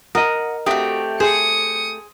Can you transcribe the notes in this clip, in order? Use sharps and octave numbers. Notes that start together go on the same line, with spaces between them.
A#4 D#5 F#5 D#6
A3 C4 F#4 G4 D#6
G#4 C5 D#6 C#7